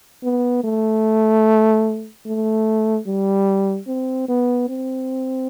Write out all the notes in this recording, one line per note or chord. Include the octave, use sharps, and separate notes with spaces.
B3
A3
A3
G3
C4
B3
C4